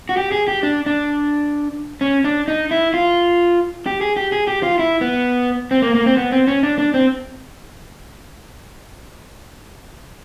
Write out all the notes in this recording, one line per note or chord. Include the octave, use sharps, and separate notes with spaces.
F#4
G4
G#4
G4
D4
D4
C#4
D4
D#4
E4
F4
G4
G#4
G4
G#4
G4
F4
E4
B3
C4
A#3
A#3
C4
B3
C4
C#4
D4
D4
C4